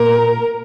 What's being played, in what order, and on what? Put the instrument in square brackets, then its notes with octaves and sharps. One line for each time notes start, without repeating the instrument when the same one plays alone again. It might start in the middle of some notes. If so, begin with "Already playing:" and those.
Already playing: [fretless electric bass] A#2 [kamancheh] A#4